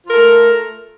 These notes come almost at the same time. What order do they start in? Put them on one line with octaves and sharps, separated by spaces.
F4 A#4 A4 A3